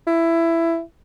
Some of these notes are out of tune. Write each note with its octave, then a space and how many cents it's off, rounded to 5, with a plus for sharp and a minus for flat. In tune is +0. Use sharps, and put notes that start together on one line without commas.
E4 +15